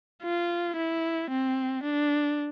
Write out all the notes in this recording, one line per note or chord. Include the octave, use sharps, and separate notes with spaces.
F4
E4
C4
D4